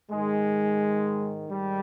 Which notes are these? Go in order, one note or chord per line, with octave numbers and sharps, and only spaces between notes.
G#2 D#3 G#3
G#2 D#3 G3